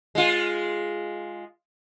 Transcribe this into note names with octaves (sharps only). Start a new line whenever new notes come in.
G#3 F4